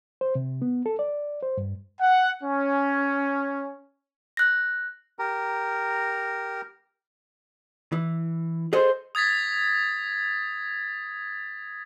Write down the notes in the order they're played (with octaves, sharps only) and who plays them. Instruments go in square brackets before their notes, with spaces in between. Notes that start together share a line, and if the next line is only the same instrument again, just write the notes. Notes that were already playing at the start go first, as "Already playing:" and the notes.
[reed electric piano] C5
C3
B3
A4
D5
C5
G2
[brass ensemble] F#5
C#4
[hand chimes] F#6 A#6
[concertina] G4 A#4 A#5
[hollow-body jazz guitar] E3
[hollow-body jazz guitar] G#4 A4 D#5 [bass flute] C5
[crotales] D#6 G#6 A6 B6